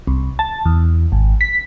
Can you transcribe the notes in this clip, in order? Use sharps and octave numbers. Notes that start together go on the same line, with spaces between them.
C2
A5
E2
G#1
B6